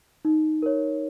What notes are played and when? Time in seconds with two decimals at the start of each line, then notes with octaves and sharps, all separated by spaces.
0.25 D#4
0.62 A#4 C#5